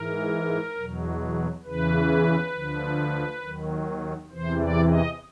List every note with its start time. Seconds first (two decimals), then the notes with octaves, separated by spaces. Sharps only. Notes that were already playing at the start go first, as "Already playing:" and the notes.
Already playing: G#2 E3 A#4
0.76 E2 B2 F#3
1.64 E2 C#3 E3 B4
2.53 D2 D3 F3
3.43 D#2 D#3 F#3
4.31 E2 C3 E3 C5
4.61 D5
4.89 D#5